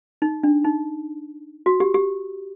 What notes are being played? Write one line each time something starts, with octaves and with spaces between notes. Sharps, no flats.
D#4
D4
D#4
F#4
G4
G4